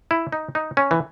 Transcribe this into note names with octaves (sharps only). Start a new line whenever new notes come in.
E4
D#4
D#4
C#4
E3